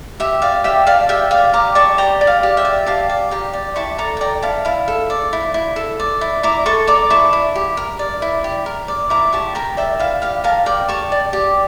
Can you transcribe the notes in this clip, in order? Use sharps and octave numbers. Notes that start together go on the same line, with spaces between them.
G4 E5
D5 F5
G4 E5 G5
D5 F5 A5
G4 E5 G5
D5 F5
G4 A#5 D6
D5 A5 C#6
G4 G5 A#5
D5
F5
G4
E5 G5
D5
G4 F5 A5
D5
G4 G5 A#5
D5
E4 A5 C#6
A4 A#5 D6
A5
D5 G5 A#5
E4 F5 A5
E4 F5
A4
D5
E4
E4
A4
D5
E4
E4 A#5 D6
A4 A5 C#6
D5 A#5 D6
E4 A5 C#6
E4
G4
A#4
D5
E4
G4
A#4
D5
E4 A#5 D6
G4 A5 C#6
A#4 G5 A#5
D5 E5 G5
E4 F5
G4 F5
A#4 F5 A5
D5 G5 A#5
G4 A5 C#6
D5
G4